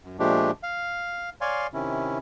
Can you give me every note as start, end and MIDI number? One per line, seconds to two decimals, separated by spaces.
0.04 0.17 42
0.19 0.51 46
0.19 0.51 53
0.19 0.51 56
0.19 0.51 57
0.19 0.51 62
0.19 0.51 67
0.63 1.30 77
1.41 1.67 73
1.41 1.67 74
1.41 1.67 77
1.41 1.67 80
1.41 1.67 84
1.73 2.18 48
1.73 2.18 51
1.73 2.18 61
1.73 2.18 64